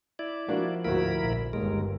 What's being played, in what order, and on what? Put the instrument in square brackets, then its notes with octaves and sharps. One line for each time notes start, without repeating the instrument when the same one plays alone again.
[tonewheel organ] E4 D5
[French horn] F3 [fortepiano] A#3 D4 F#4
[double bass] D2 G#2 [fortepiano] A#3 F#4 [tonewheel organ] E4 A#4 B5
[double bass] A#1
[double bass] G1 [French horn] D#2 [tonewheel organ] G#3 A#4